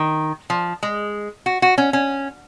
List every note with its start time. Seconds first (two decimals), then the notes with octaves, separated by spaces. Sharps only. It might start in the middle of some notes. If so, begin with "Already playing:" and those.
Already playing: D#3
0.50 F3
0.83 G#3
1.46 F#4
1.62 F#4
1.78 C#4
1.93 C#4